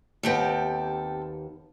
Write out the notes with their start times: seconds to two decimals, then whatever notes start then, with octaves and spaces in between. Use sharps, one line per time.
0.23 D#2 B3 C4 G4 A4